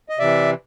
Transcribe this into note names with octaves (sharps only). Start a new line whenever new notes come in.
D#5
C3 E3 D5 E5